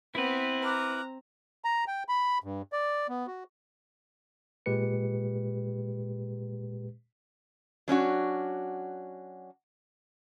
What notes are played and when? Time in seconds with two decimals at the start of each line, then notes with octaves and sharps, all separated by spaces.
0.15 B3 C4 E4 B4
0.63 A#5 D6 F6 F#6
1.65 A#5
1.88 G5
2.09 B5
2.44 G2
2.72 D5
3.09 B3
3.27 F#4
4.66 A#2 G#3 G4 B4 C#7
7.88 F#3 C#4 D4 F#4